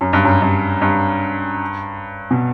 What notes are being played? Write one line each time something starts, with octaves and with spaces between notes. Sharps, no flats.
F#2
G2
F#2
G2
G2
B2